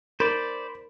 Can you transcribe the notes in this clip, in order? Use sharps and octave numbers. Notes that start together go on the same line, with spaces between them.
A#4 C5 D5 B5